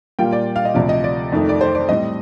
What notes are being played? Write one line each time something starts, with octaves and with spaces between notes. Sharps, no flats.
A#2 G3 A#3 F4 G5
D5
F5
D#5
D2 C3 F3 D5
D#5
D5
F2 D#3 A3 D#4
D5
C5
D5
A2 G3 C4 D#5